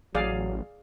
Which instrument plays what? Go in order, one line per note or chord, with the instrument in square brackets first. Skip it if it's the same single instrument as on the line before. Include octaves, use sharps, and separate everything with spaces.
[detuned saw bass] A1 [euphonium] F#3 [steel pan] G#4 D5 F5